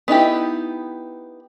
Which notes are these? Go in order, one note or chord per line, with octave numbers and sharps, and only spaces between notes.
B3 D#4 E4 G4